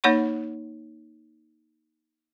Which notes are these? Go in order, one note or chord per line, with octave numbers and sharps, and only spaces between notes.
A#3 D#4 C#5 F#5 C#6